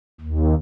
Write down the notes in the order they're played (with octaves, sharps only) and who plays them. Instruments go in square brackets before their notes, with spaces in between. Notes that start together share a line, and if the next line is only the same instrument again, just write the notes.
[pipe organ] D#2